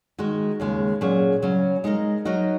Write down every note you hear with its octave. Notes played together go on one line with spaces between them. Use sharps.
D#3 G#3 F#4
D#2 C#3 G#3
A#2 F#3 C#4 G#4 C#5
C#3 F#3 C#4
G#3 D#4 A#4 D#5
F#3 D#4 F#4 A#4 D#5